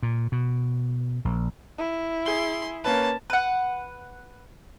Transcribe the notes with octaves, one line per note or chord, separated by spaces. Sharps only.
A#2
B2
A#1
E4
G#4 C6 G7
A#3 C#4 B4 A5
B4 F#5